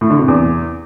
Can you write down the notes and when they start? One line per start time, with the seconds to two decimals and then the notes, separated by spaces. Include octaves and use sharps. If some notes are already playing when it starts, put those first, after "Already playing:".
0.01 A2
0.10 D3
0.19 C3
0.28 E2